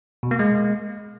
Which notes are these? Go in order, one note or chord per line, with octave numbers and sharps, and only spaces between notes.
B2
A#3
G#3